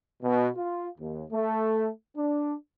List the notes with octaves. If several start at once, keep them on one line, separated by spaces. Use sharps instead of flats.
B2
F4
D#2
A3
D4